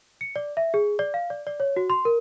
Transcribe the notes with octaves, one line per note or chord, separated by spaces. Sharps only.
C#7
D5
E5
G#4
D5
F5
D5
D5
C#5
F#4
C6
A#4